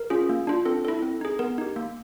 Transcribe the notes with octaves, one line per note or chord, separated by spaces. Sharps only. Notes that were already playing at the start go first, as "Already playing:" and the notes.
Already playing: A#4
C#4 F4 G#4
A#3
D4 F4
C4 A4
E4 A4
C4
D#4 G#4
B3 A#4
D#4 G4
A#3